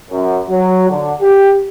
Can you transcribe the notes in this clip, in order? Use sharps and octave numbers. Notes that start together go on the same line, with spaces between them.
F#2
F#3
D3
G4